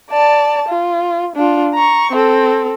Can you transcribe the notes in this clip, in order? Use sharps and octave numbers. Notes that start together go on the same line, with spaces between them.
D5 A5
F4
D4 F4
A#5 C#6
C4 A4